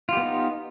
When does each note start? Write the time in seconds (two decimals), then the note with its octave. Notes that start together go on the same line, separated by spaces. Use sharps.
0.09 F4
0.13 G4
0.17 B3
0.21 D#4